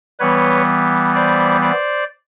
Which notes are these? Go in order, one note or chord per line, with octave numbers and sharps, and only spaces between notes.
E3 G3 B3 B4 C#5
C5 D5
C5 D5